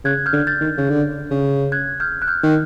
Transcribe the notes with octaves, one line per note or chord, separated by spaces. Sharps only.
C#3 F#6 G#6
F6 G6
D3
G6 A6
D#3
C#3
D3
C#3
F#6 G#6
F6 G6
F#6
F6 G6
D#3